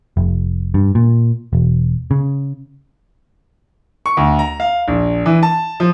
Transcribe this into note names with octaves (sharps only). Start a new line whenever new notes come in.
F1
G2
A#2
E1
C#3
C#6
D2
A#5
F5
A#1
E3
A5
F3